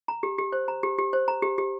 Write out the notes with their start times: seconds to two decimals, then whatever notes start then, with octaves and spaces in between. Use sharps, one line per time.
0.08 A#5
0.23 G4
0.38 G4
0.52 C5
0.68 A#5
0.83 G4
0.98 G4
1.13 C5
1.28 A#5
1.42 G4
1.58 G4